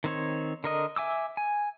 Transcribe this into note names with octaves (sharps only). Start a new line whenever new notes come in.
D#3 C4 C#5
D3 A#4 D#5
E5 G#5 D6 E6
G#5